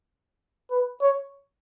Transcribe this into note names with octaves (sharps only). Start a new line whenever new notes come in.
B4
C#5